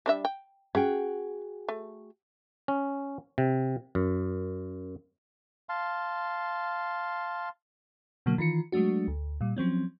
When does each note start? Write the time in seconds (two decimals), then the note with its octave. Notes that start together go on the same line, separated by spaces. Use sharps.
0.06 G3 D4 E5
0.25 G5
0.75 C#4 F#4 G#4 G5
1.68 A3
2.68 C#4
3.38 C3
3.95 F#2
5.69 F5 A5 C6
8.26 B2 D3 F#3 A#3
8.38 D#3 E3 F4 C#7
8.72 F#3 G#3 A3 D4 F#4
9.08 D2
9.41 A#2 G3
9.57 F3 F#3 C4 C#4